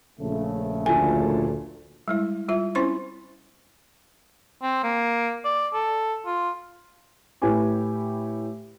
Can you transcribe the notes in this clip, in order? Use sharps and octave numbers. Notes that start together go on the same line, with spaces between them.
A#1 C#3 A3
D2 A#2 A4 G#5
G3 G#3 E4
G3 F4 E5
C4 C#4 E4 C5 C6 C#6
C4
A#3
D5
A4
F4
A2 G4 B4 G#5 D6